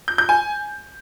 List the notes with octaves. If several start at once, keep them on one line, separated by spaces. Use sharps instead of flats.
G6
G6
G#5